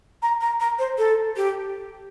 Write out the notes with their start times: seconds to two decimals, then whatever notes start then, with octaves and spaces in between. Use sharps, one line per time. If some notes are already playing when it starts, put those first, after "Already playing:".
0.22 A#5
0.41 A#5
0.60 A#5
0.79 C5
0.98 A4
1.37 G4